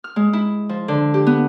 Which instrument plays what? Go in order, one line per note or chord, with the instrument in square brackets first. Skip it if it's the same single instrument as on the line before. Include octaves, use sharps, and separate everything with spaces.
[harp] F6
G#3
E4
F3
D3
G4
B3